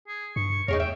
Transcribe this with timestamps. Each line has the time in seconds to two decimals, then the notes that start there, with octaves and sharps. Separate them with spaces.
0.08 G#4
0.36 G2 C#6
0.68 E2 D#4 G#4 A#4 C#5
0.80 E5 G5